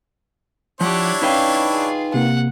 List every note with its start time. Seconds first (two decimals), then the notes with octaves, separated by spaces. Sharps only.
0.81 F3 D4 E4 G4 C#5 F#5
1.22 C#4 D#4 B4 F5 G5
1.70 F4 G#4
2.14 C3 A#3 F#5